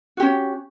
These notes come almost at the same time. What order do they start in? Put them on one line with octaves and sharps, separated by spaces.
F#4 G4 C#4